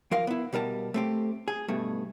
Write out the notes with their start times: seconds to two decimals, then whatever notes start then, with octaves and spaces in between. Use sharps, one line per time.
0.11 F3 A#4 F5
0.27 B3 E4
0.53 B2 G3 A#4 A5
0.94 A3 C4 G4
1.48 G#4
1.68 G2 B2 A3